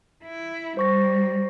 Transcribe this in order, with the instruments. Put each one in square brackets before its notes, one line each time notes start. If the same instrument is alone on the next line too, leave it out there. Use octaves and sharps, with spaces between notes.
[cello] E4
[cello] G3 [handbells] C5 C#6 A#6